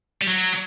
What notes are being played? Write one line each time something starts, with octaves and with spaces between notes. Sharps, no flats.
G3
F#3